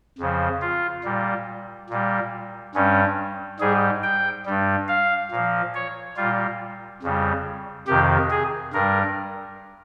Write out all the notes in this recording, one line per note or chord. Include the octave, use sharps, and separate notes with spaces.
F2 C#3 F3
F4
A#2 G3
A#2 G3
G2 G3 C#4
G#2 G3 G#4
G5
G2 G3
F5
A#2 F3
C#5
A#2 G3 F4
F2 C#3 G3
F2 C3 D#3 G4
G#4
G2 G3 A#4